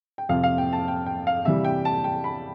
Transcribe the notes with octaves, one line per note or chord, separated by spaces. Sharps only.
G5
F2 C3 F3 F5
F5
G5
A5
G5
G5
F5
C3 E3 G3 E5
G5
A5
G5
B5